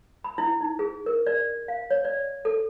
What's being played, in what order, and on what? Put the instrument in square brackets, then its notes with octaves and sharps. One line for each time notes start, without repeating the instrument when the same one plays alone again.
[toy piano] B5
E4
D#4
G#4
A#4
D5
F5
C#5
D5
A4